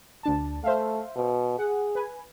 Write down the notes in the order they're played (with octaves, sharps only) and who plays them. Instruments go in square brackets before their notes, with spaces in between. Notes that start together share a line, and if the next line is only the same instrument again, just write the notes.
[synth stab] D2 D4 A5
[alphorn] A3 [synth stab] C5 E5 F5
[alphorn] B2
[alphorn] G#4 [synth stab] F#5
[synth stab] B4 G#5